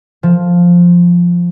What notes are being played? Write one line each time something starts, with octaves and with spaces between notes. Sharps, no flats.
F3